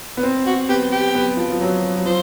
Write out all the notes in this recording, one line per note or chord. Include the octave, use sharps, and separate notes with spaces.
B3
C4
F#4
B3 G4
G4
B3
F3
F3
F#3
F#3
F3 C5